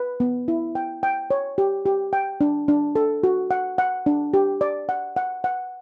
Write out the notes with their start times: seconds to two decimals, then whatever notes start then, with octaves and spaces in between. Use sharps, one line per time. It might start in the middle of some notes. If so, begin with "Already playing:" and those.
Already playing: B4
0.20 B3
0.48 E4
0.75 G5
1.03 G5
1.31 C#5
1.58 G4
1.86 G4
2.13 G5
2.41 D4
2.68 D4
2.96 A4
3.23 F#4
3.51 F#5
3.78 F#5
4.06 D4
4.34 G4
4.61 D5
4.89 F#5
5.16 F#5
5.44 F#5